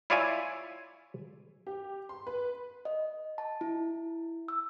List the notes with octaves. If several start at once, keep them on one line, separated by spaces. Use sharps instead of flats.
E4 F4 C#5 D5 E5 G#5
G4
C6
B4
D#5
A5
E4
E6